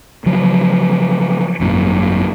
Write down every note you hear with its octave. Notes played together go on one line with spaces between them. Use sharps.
C#3 F3 F#3
G#1 F#2 A#2